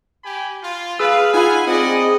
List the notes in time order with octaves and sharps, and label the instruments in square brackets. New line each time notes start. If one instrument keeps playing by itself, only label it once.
[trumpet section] G4 G#5 B5
F4
[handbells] G#4 E6 [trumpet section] B4 [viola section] F5
[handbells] D#4 B5 [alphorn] F4 [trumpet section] G#4 F#5 G#5
[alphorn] C4 [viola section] G#4 D#5 [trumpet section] D5 F#5